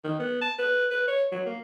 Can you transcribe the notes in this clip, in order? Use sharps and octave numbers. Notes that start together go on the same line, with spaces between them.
D#3
B3
A5
B4
B4
C#5
F#3
A#3